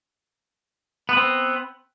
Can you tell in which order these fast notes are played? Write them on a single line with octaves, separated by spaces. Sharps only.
B3 B4 C4